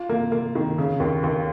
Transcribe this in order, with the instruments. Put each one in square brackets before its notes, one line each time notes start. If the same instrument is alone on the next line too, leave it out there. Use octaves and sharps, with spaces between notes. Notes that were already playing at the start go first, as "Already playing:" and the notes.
Already playing: [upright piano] F4
A#3
A#3
D#3
C#3
D#2
D#2